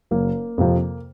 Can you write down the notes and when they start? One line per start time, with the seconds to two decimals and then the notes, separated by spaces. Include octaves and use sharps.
0.11 F#1 A#3
0.58 F2 C3 F3